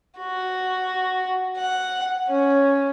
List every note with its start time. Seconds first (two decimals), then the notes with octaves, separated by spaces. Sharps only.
0.19 F#4
1.57 F#5
2.28 C#4